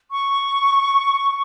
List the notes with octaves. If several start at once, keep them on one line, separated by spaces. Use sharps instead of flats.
C#6